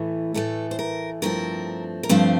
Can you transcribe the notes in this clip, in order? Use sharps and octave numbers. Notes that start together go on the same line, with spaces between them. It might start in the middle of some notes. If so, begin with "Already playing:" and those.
Already playing: A2 E3 A3
A2 E3 A3 A4
C5
A#4
G2 F3 A3 C4 A#4
A#4
G2 F3 A3 C4 C5